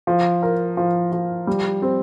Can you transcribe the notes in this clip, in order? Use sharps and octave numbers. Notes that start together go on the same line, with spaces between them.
F3
A#4
F3
F3
G3
C4